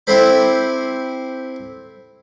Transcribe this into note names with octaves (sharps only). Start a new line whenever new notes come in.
C4 E4 G4 A4 C5 B5